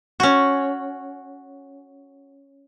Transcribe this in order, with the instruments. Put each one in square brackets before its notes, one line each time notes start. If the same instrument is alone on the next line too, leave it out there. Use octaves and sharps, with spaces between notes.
[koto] C#4 F#4